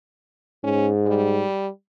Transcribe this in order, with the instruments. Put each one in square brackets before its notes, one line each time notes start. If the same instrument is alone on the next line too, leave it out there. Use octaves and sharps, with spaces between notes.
[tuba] G#2 [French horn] C#4
[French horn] G3